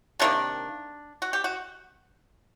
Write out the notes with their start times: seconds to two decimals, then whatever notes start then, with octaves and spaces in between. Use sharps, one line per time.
0.19 C3 D#3 G3 A#3 D4
1.22 F#4
1.33 G4
1.44 F#4